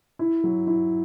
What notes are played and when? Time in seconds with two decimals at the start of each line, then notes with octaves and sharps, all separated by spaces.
0.19 E4
0.44 F#3
0.67 E4